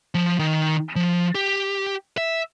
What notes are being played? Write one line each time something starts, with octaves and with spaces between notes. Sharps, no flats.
F3
D#3
F3
G4
E5